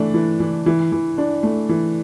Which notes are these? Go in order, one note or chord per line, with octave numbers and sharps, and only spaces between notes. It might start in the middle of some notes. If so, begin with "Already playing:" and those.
Already playing: E3 A3 D4
E3
E3
E3
E3
D4
A3
E3